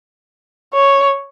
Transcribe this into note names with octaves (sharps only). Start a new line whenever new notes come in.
C#5